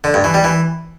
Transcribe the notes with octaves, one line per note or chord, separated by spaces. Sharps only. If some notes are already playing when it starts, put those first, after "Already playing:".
D3
G2
E3
G3
E3